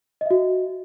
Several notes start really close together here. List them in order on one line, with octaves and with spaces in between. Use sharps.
D#5 E5 F#4